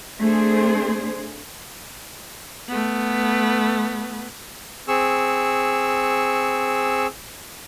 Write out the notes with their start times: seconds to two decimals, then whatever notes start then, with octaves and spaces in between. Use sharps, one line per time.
0.19 A3 C4 D4 G#4 C5
2.68 A3 B3
4.88 C4 G#4 C#6 E6